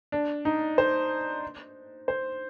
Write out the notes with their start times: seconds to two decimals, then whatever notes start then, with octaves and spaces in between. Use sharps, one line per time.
0.12 D4
0.45 D#4
0.78 C5
2.08 C5